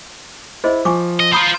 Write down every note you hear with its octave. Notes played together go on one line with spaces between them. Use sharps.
E4 G#4 C5 D#5
F3 G#5 C#6 D6
D#5
F4 C5 A#5 B5 D#6